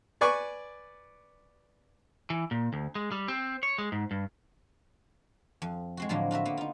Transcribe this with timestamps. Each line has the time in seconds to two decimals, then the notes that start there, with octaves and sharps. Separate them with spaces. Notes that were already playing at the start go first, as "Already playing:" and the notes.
0.21 B4 D5 G#5 C#6 D6
2.30 E3
2.51 A#2
2.73 D2
2.95 G#3
3.12 G3
3.28 C4
3.63 C#5
3.78 G#3
3.92 G#2
4.11 G2
5.62 F2
5.97 G#3 C4 F#4
6.09 A2 D3 F3 F#3 A#3
6.31 F4 F#4 A#4 E5
6.45 A#3 B3
6.57 D#4 F4